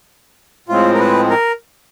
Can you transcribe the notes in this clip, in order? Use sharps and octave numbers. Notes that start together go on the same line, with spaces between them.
A2 F3 G#3 C4 F4
A#4
B4
A#4